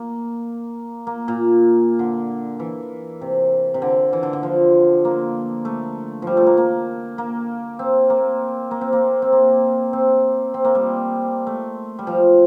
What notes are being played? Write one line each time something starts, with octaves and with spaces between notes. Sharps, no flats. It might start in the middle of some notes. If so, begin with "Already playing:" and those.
Already playing: A#3
A#3
A#2
D3
E3
C3
C3
D3
E3
D3
D3
F3
A#3
A3
F3 G3
A3
A#3
A#3
A#3
C4
A#3
A#3
C4
A#3
C4
A#3
C4
C4
A#3
G3
A3
G3
F3